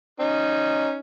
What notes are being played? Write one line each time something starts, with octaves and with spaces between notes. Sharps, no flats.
C#4 D#4